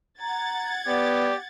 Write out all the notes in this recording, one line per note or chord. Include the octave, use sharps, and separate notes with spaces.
F#5 A#5 G#6 A6
B3 G4 D5